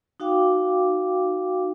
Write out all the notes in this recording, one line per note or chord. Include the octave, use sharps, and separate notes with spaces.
D#4 F#4 F5 G5 D6